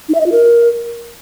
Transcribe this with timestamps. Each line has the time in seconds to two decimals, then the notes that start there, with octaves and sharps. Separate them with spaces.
0.09 D#4
0.15 E5
0.20 D#5
0.26 F4
0.32 A#4